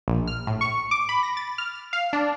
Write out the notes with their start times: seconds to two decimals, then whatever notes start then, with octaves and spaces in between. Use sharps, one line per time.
0.08 A#1
0.27 F6
0.47 A2
0.61 C#6
0.91 D6
1.09 B5
1.23 A#6
1.37 A6
1.58 F6
1.93 F5
2.13 D4